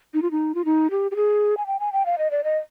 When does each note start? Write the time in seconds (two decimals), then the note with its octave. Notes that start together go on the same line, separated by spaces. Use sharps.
0.14 D#4
0.22 F4
0.31 D#4
0.55 F4
0.65 D#4
0.91 G4
1.11 G4
1.16 G#4
1.57 G#5
1.67 G5
1.80 G#5
1.93 G5
2.06 F5
2.18 D#5
2.31 D5
2.44 D#5